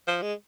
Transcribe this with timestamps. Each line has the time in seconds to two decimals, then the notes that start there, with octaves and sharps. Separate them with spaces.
0.07 F3
0.22 G#3